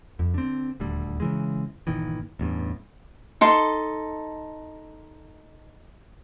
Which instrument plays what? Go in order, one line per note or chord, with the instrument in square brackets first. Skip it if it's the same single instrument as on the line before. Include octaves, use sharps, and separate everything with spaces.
[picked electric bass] F2
D3 C4
D#1 D2 D3 G3
C#3 E3 G#3
G1 A#2 D#3 E3
A1 E2 G2
[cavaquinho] D#4 A4 C6